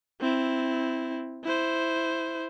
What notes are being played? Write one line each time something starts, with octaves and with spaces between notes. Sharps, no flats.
C4 E4
E4 C5